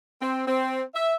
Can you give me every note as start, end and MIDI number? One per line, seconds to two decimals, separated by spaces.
0.21 0.44 60
0.47 0.82 60
0.95 1.15 76